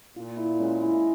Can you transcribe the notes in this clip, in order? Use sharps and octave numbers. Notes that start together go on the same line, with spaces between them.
A#2 F4
E4
G#3 C#4
E4